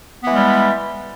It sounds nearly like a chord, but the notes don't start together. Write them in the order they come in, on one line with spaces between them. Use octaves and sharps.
B3 E3 G#3 G3